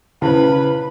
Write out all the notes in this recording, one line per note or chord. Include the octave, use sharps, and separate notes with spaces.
C#3 E4 B4 C5 B5